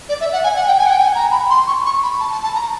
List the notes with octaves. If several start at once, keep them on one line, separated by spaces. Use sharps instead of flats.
D5
E5
F#5
G#5
F#5
G5
G#5
F#5
G5
G#5
A#5
B5
C6
C#6
C#6
B5
A5
A5
A5
A#5